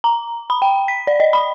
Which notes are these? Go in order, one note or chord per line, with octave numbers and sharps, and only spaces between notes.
A#5
B5
G5
B6
D5
D#5
B5